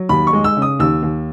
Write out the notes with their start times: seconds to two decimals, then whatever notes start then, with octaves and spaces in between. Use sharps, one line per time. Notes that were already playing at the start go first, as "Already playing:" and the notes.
Already playing: F#3
0.09 D#2 B5
0.27 C#6
0.33 G#3
0.44 E6
0.56 C#3
0.62 D#6
0.79 D#2 E6
1.03 D#2